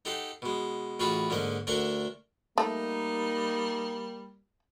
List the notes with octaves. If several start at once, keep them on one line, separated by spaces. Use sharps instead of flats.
D#4 G4 A4 F#5 C6
B2 G#3
A1 F4 F#4 G#4 B4 B5
G#2 D3 A#3 C#4 D#5
D2 D4 A4 A#4 F#5 G#5
G3 A3 A#3 D#4